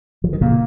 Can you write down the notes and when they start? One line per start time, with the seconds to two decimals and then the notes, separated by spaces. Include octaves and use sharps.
0.24 F3
0.33 D#3
0.41 A#2 C#3 A#3